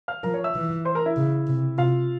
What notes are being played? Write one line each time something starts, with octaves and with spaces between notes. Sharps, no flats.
F5 F6
F3 A#4 A#5
C#5 C#6
E5 E6
E3
C5 C6
A#4 A#5
E4 E5
C#3
C3
C3 F4 F5